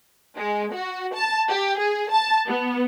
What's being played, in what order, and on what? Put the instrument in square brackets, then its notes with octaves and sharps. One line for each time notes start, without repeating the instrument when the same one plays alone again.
[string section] G#3
F#4
A5
G4
G#4
A5
B3